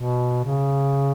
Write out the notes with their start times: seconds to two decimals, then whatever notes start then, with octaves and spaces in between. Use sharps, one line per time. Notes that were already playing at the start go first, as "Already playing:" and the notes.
Already playing: B2
0.45 C#3